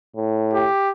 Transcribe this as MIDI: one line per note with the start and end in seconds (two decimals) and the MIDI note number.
0.16 0.65 45
0.54 0.90 67